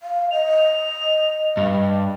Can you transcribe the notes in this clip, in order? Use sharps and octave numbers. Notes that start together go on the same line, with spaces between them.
F5
D#5 F7
G2